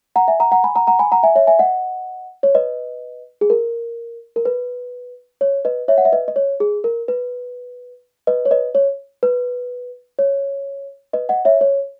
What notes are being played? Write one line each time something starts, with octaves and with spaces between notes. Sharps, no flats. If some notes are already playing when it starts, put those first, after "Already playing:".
F#5 A#5
E5 G#5
F#5 A#5
F#5 A#5
G#5 B5
F#5 A#5
F#5 A#5
G#5 B5
F#5 A#5
E5 G#5
C#5 E5
E5 G#5
D#5 F#5
C#5
B4 D#5
G#4
A#4
A#4
B4
C#5
B4 D#5
C#5 E5
F#5
E5
B4 D#5
D#5
C#5
G#4
A#4
B4
B4 D#5
C#5
B4 D#5
C#5
B4
C#5
B4 D#5
D#5 F#5
C#5 E5
C#5